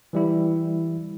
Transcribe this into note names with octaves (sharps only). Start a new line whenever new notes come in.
E3 G3 E4